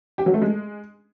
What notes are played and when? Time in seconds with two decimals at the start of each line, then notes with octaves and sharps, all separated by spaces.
0.18 G4
0.26 F#3
0.34 A3
0.42 G#3